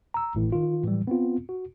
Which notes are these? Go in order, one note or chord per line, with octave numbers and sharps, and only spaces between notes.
A#5 E6
G#1 A2 E3
D#3 F4
A2 E3 F#3 G3
B3 C4 F4
F#4